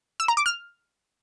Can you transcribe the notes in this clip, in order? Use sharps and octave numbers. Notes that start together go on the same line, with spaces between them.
E6
A#5
D6
F6